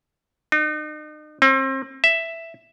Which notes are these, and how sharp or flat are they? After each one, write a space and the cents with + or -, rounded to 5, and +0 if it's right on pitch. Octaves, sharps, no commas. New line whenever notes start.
D#4 -40
C4 +35
E5 +5